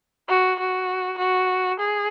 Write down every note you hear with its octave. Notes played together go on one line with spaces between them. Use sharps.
F#4
F#4
F#4
G#4